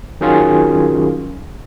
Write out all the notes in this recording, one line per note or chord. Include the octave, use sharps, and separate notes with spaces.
D#3 F#3 C#4 F4 G#4